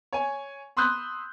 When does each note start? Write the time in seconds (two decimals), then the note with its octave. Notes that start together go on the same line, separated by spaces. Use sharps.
0.13 C#5 G#5
0.77 B5 C6 D#6 E6 F#6 G6